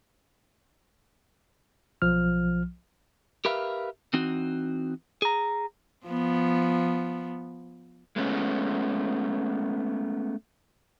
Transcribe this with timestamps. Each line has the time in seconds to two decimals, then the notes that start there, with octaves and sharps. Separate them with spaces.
2.02 B1 F3 F6
3.45 G4 A#4 B4 E5 F5
4.13 E3 C4 D#4 F#4
5.22 G#4 A#5
6.06 F3 B3
8.16 G#3 A3 B3 C#4